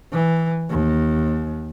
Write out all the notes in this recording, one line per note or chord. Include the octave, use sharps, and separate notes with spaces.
E3
D#2